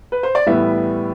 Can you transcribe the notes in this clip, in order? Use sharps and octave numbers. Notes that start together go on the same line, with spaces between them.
B4
C5
D5
A2 E3 G3 B3 E5